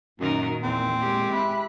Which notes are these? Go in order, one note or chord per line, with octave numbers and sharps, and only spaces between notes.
F#2 A#2 D#3 D#4 A#4
E2 C4
G#3 G4
E5 B5 F#6